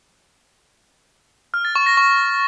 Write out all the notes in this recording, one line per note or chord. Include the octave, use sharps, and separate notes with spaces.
F6
A6
C#6
A#6
C#6